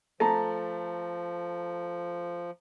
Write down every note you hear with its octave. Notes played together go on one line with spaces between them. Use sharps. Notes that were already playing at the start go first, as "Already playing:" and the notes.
F3 A3 A5 A#5